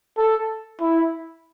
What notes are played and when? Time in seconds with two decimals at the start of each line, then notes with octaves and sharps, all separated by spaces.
0.18 A4
0.81 E4